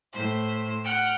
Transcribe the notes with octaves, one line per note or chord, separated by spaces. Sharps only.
A2 C5
F#5 G5 F6